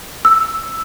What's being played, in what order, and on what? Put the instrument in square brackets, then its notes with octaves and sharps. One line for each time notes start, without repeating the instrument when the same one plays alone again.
[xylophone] E6